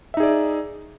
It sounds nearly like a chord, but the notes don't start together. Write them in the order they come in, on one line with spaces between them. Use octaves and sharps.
E5 D#4 G#4 D5